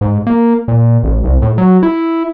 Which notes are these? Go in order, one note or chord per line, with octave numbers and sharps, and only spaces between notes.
G#2
A#3
A#2
A1
C2
A2
F#3
E4